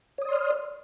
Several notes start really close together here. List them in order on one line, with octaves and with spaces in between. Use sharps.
C#5 D#6 D5 C6 F6